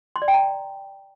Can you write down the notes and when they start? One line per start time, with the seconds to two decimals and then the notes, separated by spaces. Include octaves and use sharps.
0.16 C6
0.22 D5
0.28 G5
0.34 A#5